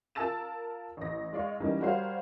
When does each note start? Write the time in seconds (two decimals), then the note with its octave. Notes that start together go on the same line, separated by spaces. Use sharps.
0.15 F4 A#4 A5 E6 A6 E7
0.97 A1 A#6
1.33 G#3 D5 F5 C#6
1.60 E3 G3 A#3 C#4 D#4
1.80 G3 F#4 A#4 C5 C#5 F5